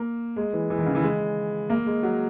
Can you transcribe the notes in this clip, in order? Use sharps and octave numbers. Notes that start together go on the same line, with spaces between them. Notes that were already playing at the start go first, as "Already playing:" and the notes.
Already playing: A#3
G#3
E3
E3
D#3
C#3
E3
G#3
A#3
G#3
F#3